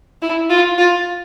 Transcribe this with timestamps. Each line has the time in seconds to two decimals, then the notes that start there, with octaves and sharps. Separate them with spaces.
0.22 E4
0.50 F4
0.78 F4